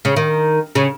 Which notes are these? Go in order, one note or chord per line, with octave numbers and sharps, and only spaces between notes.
C#3
D#3
C#3